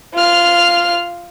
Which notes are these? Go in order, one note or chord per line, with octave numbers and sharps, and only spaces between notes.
F4 F6